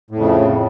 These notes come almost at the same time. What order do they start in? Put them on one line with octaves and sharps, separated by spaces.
A2 F2 C#3